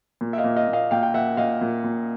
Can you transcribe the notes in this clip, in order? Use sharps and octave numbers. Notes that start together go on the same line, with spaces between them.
A#2
E5
D#5 F5
A#2
D#5 F5
A#2
D#5 F5
A#2 F5 G5
G5
A#2 E5 F#5
A#2 D#5 F5
A#2
A#2